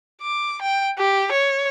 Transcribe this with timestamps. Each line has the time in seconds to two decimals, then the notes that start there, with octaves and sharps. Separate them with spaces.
0.22 D6
0.62 G5
0.98 G4
1.32 C#5